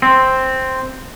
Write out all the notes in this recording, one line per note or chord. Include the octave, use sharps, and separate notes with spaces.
C4